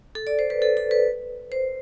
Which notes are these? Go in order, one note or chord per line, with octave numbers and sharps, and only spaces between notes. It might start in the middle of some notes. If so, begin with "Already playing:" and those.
A4
D5
C5
B4
A4
A4
B4
C5